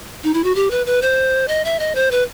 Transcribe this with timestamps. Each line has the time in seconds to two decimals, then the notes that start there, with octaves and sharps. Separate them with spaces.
0.24 D#4
0.34 E4
0.44 F#4
0.55 G4
0.71 B4
0.86 B4
1.02 C5
1.48 D#5
1.65 E5
1.79 D#5
1.95 C5
2.11 B4